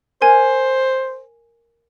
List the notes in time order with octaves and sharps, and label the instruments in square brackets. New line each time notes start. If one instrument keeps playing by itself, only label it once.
[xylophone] A#4 G#5 G#6 [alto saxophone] C5